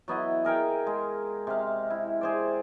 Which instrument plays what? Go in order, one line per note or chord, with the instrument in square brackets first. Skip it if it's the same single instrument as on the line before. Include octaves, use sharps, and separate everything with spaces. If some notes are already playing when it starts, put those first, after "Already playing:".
[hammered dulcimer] F#3 B3 E4 D#5
G#4 A#4 F5 G5
G#3
C3 F5
E4
G#4 C5 D5